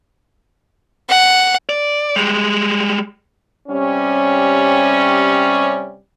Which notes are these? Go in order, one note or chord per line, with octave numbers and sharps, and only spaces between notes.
F#5
D5
G3 G#3
C3 G3 C#4